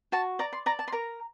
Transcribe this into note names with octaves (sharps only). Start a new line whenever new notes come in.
F#4 A5
D5 A#5
C6
D5 A#5
A5
C6
A#4 A#5